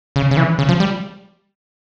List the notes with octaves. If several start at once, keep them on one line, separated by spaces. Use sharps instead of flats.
C#3
C#3
E3
C#3
F3
G3